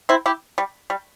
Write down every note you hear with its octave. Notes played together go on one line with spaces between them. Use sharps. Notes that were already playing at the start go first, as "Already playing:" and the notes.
C4 E4
E4 G4
G3
G3